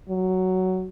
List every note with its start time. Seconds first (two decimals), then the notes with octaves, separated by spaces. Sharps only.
0.09 F#3